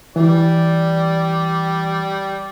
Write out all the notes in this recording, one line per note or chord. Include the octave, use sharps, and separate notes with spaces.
E3 G3 D5